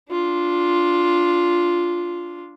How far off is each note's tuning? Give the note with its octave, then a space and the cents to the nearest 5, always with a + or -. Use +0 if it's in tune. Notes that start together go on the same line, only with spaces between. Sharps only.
D4 -10 F4 +0